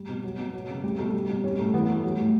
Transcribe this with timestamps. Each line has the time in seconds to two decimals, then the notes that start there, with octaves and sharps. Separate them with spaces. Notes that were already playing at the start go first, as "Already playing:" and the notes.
Already playing: G3
0.09 B2
0.24 F#3
0.39 B2
0.54 F#3
0.69 C#3
0.84 F#3 G3
0.99 B2 A3
1.14 G3
1.29 B2
1.44 G3 C#4
1.58 A2 A3
1.74 E3 B3
1.89 G3 A3
2.03 F#3
2.19 A2